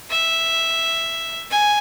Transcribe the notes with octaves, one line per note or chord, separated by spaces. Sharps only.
E5
G#5